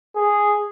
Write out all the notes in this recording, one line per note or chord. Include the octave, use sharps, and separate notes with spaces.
G#4